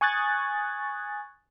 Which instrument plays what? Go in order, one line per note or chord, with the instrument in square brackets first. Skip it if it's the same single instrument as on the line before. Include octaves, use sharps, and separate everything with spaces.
[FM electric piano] G#5 C#6 D#6 F#6 G#6 A6